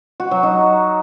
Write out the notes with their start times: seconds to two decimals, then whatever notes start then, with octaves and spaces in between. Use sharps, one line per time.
0.20 F#4
0.31 F#3
0.43 D#4